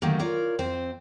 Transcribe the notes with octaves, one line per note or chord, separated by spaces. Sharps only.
D3 D#3 F#3 G3 A3 A#3
F4 A#4 C#5 D5
F2 C4 C5